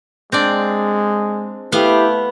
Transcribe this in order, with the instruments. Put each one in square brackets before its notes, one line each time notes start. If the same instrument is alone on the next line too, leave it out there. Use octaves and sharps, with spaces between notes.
[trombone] G#3 [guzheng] C4 D4 D5
[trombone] A3 [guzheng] B3 F5 [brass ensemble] E4 G4